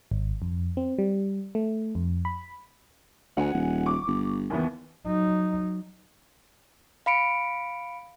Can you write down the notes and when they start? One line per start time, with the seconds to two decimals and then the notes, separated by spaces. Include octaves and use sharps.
0.11 G#1
0.42 F2
0.77 C4
0.99 G3
1.55 A3
1.95 F2
2.25 B5
3.37 D2 F#5 G#5
3.54 D#1
3.86 C#6 D6
4.07 G1
4.50 D#2 E3 B3
5.05 F#3 D#4
7.06 F5 B5 C#7 D7